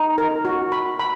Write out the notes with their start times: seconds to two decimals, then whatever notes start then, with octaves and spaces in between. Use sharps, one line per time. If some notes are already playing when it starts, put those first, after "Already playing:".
Already playing: D#4
0.18 A#4
0.45 F#4
0.72 B5
0.99 B5